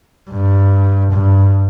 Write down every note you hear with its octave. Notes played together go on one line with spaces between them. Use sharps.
G2
G2